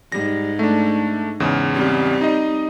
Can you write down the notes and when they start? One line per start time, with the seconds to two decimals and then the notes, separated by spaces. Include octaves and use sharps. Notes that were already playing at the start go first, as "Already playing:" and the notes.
0.12 G#2 G3 A#6
0.59 A3 D4
1.40 E2 G#2 C#3
1.75 G3 C4
2.21 D#4 D#5